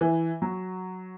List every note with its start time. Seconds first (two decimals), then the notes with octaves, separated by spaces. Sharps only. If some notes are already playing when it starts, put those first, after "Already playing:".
0.01 E3
0.42 F#3